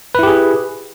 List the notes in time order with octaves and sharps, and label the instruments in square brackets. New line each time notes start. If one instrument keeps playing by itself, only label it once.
[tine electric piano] B4
E4
G4
G#4